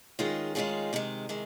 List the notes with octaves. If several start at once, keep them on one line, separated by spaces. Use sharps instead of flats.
D#3 G#3 C#4 F4 G#4
D#3 G#3 C#4 F4 G#4
C3 D#3 G#3
C3 D#3 G#3